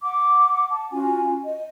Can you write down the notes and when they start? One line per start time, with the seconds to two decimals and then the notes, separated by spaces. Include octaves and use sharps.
0.04 F#5 D6
0.69 A5
0.91 C#4 F4 F#4 G#5
1.42 D#5